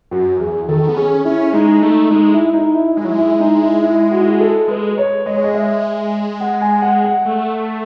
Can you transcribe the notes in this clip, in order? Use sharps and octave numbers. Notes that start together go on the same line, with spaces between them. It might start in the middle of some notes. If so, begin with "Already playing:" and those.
F#2 F#4
E2 G#4
D#3 A4
B3
C#4 G#4
C#4 E4
G#3 D#4
A3 D#4
G#3 D#4
E4
D#4
E4
G#3 E4
F#3
G#3
E4
D#4
E4
E4
F#4
E4
F#4
A4
G#3 B4
C#5
G#3 D#5
C#5
D#5
E5
F#5
G#5
F#5
F#5
A3